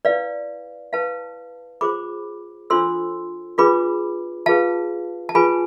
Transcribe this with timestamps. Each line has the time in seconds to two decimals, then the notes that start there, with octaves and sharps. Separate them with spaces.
0.05 E4 B4 D5 F5
0.93 E4 B4 F5 A5
1.81 F4 G#4 C5 B5 D6
2.70 D4 F4 A4 C5 C6 E6
3.58 D4 F4 G#4 B4 B5 D6
4.46 F4 G#4 B4 F5 A5
5.29 A5
5.35 F4 G#4 B4 G#5 B5